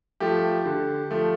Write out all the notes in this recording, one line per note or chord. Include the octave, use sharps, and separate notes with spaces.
F3 A3 G4
D3
F3 A3